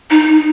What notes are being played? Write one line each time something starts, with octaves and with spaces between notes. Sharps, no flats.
D#4